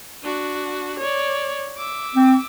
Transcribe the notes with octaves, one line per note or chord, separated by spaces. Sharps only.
D4 F#4
C#5 D5
E5 D6
C4